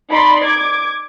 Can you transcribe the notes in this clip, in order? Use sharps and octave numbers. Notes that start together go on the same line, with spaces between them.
D#4 D5 B5 C6
D6 G#6